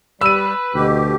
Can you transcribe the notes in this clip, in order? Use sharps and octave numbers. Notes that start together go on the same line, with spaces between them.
G3 B4 B5 E6 D#7
D2 B2 G4